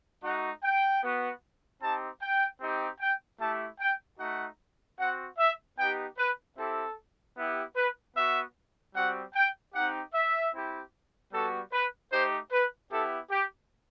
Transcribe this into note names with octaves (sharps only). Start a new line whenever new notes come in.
A3 D#4 F#4 F#5
G5
B3 F#4
C4 D#4 G4 A5
G5
C4 D#4 G4
G5
A3 E4 G4 A5
G5
A3 D#4 F#4 F#5
C4 F#4 F#5
E5
B3 D#4 G4 G5
B4
C4 E4 G4 A4
B3 E4 G4
B4
B3 F#4 E5
G3 C4 F#4 F#5
G5
C4 D#4 G4 F#5
E5
C4 E4 G4
G3 B3 F#4 A4
B4
A3 D#4 G4 C5
B4
B3 E4 G4 A4
G4